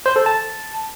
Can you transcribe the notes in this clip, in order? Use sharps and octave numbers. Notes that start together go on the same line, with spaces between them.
C5
A4
A5